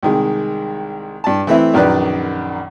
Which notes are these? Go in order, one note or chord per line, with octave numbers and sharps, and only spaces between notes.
C2 D#3 G#3
G2 A5
E3 A3 C4 E4 B4 E5
A#1 F#2 D#3 B4 D5 F#6